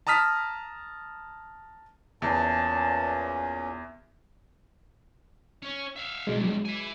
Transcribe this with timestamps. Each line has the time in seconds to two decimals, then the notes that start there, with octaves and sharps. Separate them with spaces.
0.07 A5 A#5 D#6 F6 B6
2.22 E2 A#2 C#4 A5
5.62 C#4 C#5
5.96 E5 F5
6.27 E2 G2 B2 G#3
6.41 F#3 G#3
6.65 E5 G#5